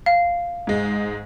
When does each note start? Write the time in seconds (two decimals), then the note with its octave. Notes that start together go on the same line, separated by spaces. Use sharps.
0.06 F5
0.67 G#2 G#3